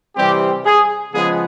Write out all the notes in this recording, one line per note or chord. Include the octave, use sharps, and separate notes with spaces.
C3 E3 G3 C4 G4
G#4
C#3 F3 G#3 B3 G#4